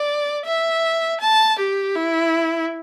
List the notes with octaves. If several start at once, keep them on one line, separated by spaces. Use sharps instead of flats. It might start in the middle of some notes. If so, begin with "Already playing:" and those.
Already playing: D5
E5
A5
G4
E4